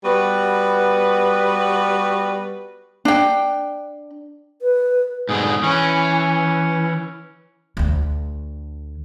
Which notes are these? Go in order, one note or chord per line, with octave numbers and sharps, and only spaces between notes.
G3 B3 F#4 B4
D4 G5
B4
G#2 B2 D3 G#4
E3 C#4
D2 D3